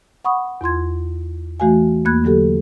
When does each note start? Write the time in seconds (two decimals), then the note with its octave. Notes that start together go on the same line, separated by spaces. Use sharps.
0.25 F#5 B5 C#6 D#6
0.61 E2 F4 C6 G#6
1.60 E3 A3 F#4 F5 G#5
2.05 E2 A#3 B5 F#6 G#6
2.24 D3 F#3 G4 A4